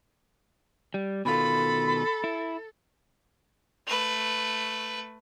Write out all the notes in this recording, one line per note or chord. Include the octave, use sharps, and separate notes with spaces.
G3
B2 D#3 F4 A4 B5
E4
A3 B4